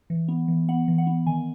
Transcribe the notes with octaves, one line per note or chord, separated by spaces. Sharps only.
E3
B3
E3
B3 F#5
E3
F#5
B3
D#3 G#5